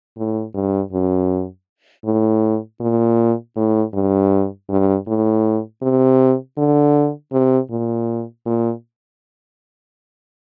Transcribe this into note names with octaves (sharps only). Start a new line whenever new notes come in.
A2
G2
F#2
A2
A#2
A2
G2
G2
A2
C3
D3
C3
A#2
A#2